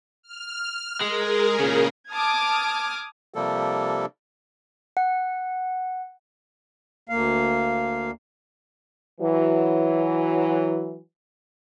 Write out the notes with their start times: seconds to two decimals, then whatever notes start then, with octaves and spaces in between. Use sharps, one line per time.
0.23 F6
1.01 G#3 G#4 A#4
1.60 A#2 C#3
2.10 A5 D6 D#6 F6 G#6
3.34 C3 F3 G3 A#3 A4
4.97 F#5
7.09 D2 A#3 F5
9.20 E3 F#3